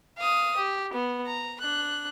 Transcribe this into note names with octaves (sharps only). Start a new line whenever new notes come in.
F5 D#6
G4
B3
A#5
D4 F#6